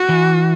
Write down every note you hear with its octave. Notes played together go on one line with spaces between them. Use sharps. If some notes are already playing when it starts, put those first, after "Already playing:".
Already playing: F#4
E3